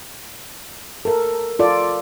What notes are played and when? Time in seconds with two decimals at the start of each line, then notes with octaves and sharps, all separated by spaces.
1.05 A4 A#4
1.59 F4 A4 D5